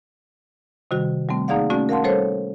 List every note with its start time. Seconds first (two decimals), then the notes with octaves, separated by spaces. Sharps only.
0.91 C3 D#3 G3 F#4
1.29 G3 A3 C4
1.48 A#3 D#4 G#4 D5 F5 F#5
1.70 A3 C#4 F#4 D5
1.89 A#4 F5 F#5 A5 C6
2.04 G3 A4 C5 C#5